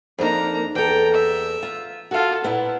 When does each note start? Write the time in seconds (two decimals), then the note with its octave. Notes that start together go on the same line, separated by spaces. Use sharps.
0.19 F2 A#3 D4 D#4 A#5
0.75 E2 A4 G5 A#5
1.14 E5
1.63 F4
2.11 F4 F#4 A4 F5
2.44 A#2 B3 E4